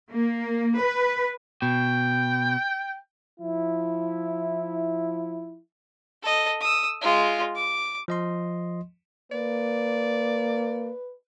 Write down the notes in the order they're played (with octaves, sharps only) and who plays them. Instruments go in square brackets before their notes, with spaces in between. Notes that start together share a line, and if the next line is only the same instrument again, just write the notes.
[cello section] A#3
B4
[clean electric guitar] B2 [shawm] G5
[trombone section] F3 E4
[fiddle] A4 D#5
D#6 E6
G#3 F4
D6
[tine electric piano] F3 D#5 C6
[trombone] A#3 [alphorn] B4 [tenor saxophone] D5